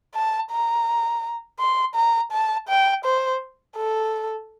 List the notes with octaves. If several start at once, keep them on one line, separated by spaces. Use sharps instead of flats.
A5
A#5
C6
A#5
A5
G5
C5
A4